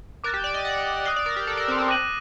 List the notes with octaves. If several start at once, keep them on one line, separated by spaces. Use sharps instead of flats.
A#4 D6 F#6 A6
G4
D5
D#5
F#5
D#5 D#6 F#6 C7
D5
A#4
G4
A4
A#4
C4
C4
D6 F#6 A#6 D#7 F#7